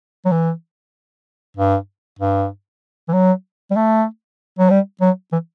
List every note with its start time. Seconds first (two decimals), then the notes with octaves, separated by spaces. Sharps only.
0.25 F#3
0.32 E3
1.57 G2
2.19 G2
3.09 E3
3.13 F#3
3.71 G3
3.76 A3
4.59 F#3
4.70 G3
5.01 F#3
5.32 E3